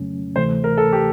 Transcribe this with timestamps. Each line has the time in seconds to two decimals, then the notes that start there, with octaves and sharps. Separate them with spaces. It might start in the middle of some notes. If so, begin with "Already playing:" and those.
Already playing: F2 C#3 F#3 A3 C#4
0.36 D2 C3 E3 A3 C5
0.64 A#4
0.77 A4
0.92 G4